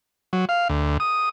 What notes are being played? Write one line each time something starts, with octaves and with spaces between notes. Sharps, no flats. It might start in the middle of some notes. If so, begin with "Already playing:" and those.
F#3
F5
D2
D#6